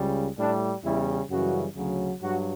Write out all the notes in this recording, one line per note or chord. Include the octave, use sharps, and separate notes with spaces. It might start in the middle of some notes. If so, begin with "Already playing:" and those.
Already playing: C#2 C#3 G3
A2 G3 D4
E2 C#3 G3 E4
F#2 C#3 E3 G3 F#4
D2 C#3 F#3
G2 F#3 F#4